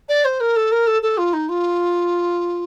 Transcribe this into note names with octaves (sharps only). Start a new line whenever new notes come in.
D5
C5
A#4
A4
A#4
A4
A4
F4
D#4
F4